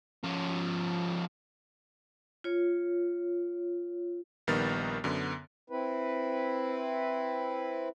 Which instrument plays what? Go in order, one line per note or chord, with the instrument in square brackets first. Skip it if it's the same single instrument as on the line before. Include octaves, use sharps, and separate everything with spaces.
[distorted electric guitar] F3 C#4
[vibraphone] F4 C#5
[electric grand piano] A#1 D#3 G3 B3 A#4 A6
F#2 D3 B3
[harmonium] C4 E4 B4